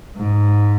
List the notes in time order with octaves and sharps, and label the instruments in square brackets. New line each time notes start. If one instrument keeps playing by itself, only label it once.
[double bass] G#2